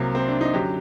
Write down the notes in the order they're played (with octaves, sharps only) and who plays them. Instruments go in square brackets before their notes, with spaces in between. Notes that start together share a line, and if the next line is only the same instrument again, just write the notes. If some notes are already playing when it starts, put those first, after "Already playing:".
Already playing: [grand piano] C2 C3 F#3 A#3
C4
D4
D#4
F#2 D3 F#3 G4